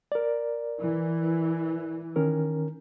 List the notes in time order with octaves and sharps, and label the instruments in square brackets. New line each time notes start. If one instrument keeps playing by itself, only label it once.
[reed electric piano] A#4 D5
[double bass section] E3
[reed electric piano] D#3 C#4 A#4